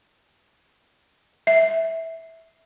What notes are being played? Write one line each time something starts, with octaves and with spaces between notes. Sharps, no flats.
E5